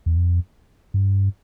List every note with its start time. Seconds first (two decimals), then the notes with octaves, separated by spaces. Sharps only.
0.06 E2
0.17 F2
0.94 G2